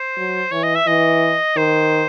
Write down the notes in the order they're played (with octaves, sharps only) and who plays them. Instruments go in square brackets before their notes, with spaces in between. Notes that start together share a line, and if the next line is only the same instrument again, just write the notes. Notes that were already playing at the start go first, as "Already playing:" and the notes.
Already playing: [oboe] C5
[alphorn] F#3
[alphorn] E3 [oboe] C#5
[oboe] D#5
E5
[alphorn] E3 [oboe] D#5
[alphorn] D#3 [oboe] C5